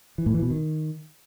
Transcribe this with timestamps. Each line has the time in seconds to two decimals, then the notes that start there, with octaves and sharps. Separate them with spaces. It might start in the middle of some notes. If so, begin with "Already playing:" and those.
0.18 E3
0.26 A2
0.34 E3
0.42 B2
0.50 D#3